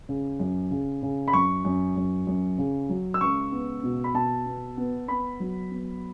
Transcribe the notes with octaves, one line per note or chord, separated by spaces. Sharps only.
C#3
F#2
C#3
C#3
B5
F#2 C#6
F#2
F#2
F#2
C#3
F#3
E6
C#2 C#6
B3
B2
B5
B2 A5
B3
B3
B3 B5
F#3
B3